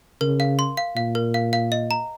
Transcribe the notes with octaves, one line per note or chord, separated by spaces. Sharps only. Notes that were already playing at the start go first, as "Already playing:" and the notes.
C#3 A#4
F5
C6
F5
A#2 F5
A#4
F5
F5
D#5
A#5